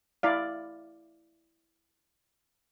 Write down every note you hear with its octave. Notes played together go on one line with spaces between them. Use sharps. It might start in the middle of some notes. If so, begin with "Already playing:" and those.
E4 D5 F5